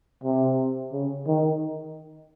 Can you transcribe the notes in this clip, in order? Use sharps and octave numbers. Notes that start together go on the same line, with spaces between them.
C3
C#3
D#3